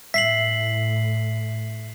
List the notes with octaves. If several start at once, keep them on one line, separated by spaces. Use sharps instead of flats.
A2 E5 B6 C7 F#7